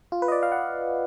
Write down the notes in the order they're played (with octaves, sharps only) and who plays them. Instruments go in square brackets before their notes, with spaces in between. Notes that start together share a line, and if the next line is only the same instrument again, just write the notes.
[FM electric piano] F4
B4
D#5
D5
F5
F#5